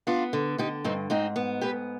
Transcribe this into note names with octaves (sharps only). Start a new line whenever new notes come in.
B3 D4 F4
D3
D3 D#4 G4
G2 C4 D#4
G#2 C4 D#4
B3
G#2 G4 B4